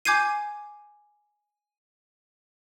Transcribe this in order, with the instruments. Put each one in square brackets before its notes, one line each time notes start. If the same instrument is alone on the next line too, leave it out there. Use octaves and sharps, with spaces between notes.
[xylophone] G#5 D6 G6 G#6 C7 D#7